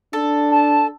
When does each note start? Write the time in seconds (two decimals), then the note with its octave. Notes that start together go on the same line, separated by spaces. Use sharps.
0.13 D4 A4
0.51 A5